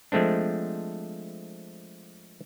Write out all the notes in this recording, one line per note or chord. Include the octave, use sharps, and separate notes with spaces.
F3 G#3 A3 C4 D4